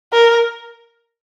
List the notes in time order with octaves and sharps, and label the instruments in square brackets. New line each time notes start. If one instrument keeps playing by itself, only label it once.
[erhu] A#4